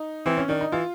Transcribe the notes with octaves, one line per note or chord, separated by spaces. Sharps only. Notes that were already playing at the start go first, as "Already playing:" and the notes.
Already playing: D#4
E3 C4
C#4
D#3 D4
D#4
E3 F4